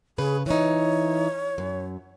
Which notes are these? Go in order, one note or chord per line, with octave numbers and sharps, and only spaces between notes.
C#3 G#4 B4 C#5
E3 D#4 C#5
F#2